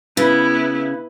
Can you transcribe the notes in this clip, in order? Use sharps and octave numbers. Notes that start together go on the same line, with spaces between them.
C#3 B3 E4 B4